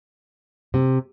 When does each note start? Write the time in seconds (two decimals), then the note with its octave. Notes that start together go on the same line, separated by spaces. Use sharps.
0.74 C3